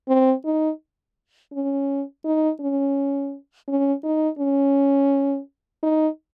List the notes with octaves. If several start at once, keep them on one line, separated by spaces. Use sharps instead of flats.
C4
D#4
C#4
D#4
C#4
C#4
D#4
C#4
D#4